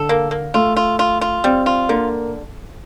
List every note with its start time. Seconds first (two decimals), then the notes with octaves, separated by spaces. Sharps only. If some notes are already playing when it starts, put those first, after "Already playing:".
Already playing: D3 A4
0.09 A#3
0.31 A#3
0.54 A3 F4
0.76 F4
0.99 F4
1.21 F4
1.44 G3 C4
1.66 F4
1.89 D3 A#3